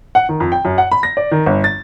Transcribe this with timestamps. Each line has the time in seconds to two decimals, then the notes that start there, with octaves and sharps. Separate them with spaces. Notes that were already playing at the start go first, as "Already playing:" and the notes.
0.15 F#5
0.29 D#3
0.40 F2
0.52 G5
0.65 F#2
0.78 F#5
0.92 B5
1.03 A#6
1.17 D5
1.32 D#3
1.46 G1
1.64 A6